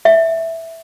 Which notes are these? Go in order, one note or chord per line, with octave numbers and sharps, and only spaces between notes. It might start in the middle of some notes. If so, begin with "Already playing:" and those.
E5